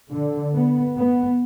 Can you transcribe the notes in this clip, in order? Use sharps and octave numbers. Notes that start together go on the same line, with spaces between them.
D3
B3
B3